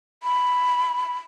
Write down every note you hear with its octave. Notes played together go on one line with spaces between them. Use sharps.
B5